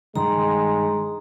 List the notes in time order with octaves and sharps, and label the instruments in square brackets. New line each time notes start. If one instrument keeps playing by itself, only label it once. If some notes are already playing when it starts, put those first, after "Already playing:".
[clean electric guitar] G2 D#3 [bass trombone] G#3 [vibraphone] A#5 C6